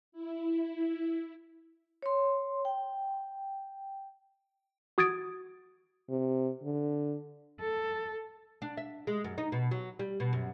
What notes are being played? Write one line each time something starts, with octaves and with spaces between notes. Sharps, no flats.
E4
C#5 C6
G5
F#4 D#6 G#6 A6 D7
C3
D3
A4
D4
E5
G#3
F#2
D#4
B2
F#3
G3
B2
F#2